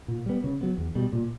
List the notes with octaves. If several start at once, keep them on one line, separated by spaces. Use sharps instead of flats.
A#2
G3 B3
C#3
F#3 B3
E2
B2 G3
A#2